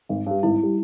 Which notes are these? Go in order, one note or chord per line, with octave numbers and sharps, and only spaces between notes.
G#1
G2 G3
G#1 E4
G3